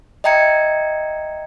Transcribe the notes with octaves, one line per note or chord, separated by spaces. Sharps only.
D#5 E5 G5 A#5 G#6 C#7